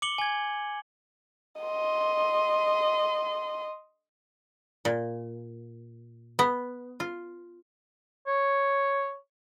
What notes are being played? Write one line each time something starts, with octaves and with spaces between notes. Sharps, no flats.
D6 C#7 F#7 G7
G#5 G#6
D#5 C6
A#2
B3
F4
C#5